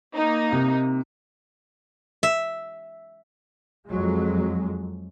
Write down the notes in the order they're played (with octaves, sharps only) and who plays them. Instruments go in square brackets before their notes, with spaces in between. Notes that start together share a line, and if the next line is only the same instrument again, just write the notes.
[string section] A#3 D#4
[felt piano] C3
[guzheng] E5
[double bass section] F2 F#3 G#3